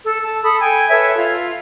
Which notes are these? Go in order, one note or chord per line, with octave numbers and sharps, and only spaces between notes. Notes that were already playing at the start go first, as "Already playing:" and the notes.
A4
A5
A4 B5 D#6
G5 G#5
A4 B4 C#5 E5
F4